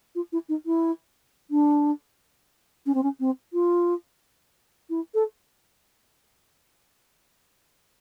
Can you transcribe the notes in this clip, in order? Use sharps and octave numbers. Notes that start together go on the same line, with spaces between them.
F4
E4
D#4
E4
D4
C#4
C4
C#4
C4
F4
E4
A4